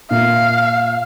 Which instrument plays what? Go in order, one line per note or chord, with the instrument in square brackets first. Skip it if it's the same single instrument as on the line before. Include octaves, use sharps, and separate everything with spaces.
[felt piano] A#2 E5 [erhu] F5